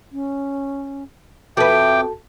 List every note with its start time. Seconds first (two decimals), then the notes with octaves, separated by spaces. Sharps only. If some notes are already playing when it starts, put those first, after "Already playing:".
0.12 C#4
1.57 F2 F#4 A4 B4 E5 G5 A5 D6